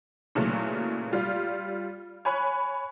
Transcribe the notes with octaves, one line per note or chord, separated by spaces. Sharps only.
A#2 C#3 E3 F#3 A3
G3 F4
C#5 G#5 B5 F#6